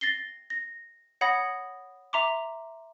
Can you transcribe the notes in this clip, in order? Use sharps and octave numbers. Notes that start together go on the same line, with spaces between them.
A6 A#6 C7 G7
A#6
C#5 F#5 B5 D#6 A#6
E5 A#5 C6 D6